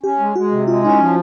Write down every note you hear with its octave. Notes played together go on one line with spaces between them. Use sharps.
C#4 G4
G#3
G#3 F#4
C3
G#3 F4
C#4 D#4
E4
F3